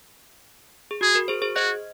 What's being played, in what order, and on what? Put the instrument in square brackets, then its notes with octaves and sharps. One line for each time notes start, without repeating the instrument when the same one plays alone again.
[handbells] G#4
[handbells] F#4 [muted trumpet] G#4
[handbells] F#4 A#4
G#4 C5
G#4 C5
[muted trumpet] F#4 [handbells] C5 D#5